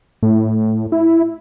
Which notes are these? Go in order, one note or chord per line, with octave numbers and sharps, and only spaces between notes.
A2
E4